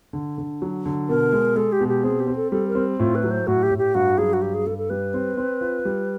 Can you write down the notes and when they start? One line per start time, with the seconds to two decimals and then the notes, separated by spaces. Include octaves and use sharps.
0.13 D3
0.38 D3
0.62 F#3
0.86 D3
1.09 B2 A#4
1.32 G#3
1.56 G#3 A4
1.72 G4
1.80 B2
1.88 G4
2.04 C4 G#4
2.20 G4
2.27 C4
2.36 A4
2.52 G3 A4
2.68 A#4
2.75 C4
2.99 A2 F4
3.15 B4
3.24 F#3
3.31 C5
3.47 A2 F#4
3.63 G4
3.71 A2
3.78 G4
3.94 G2 F#4
4.18 F#3 G#4
4.33 F#4
4.42 G2 G4
4.54 G#4
4.66 G2 A4
4.78 A4
4.90 G3 B4
5.14 C4
5.37 C4
5.61 F4
5.85 G3